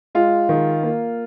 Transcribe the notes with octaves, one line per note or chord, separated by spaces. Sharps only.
G#3 F4
D#3
A#3